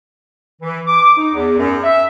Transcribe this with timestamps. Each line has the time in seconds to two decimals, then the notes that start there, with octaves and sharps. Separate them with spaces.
0.62 E3
0.87 D6
1.18 D#4
1.34 E2
1.59 F#2
1.84 E5